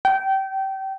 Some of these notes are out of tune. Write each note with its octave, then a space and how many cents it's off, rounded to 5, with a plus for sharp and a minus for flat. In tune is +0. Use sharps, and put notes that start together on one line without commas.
G5 -25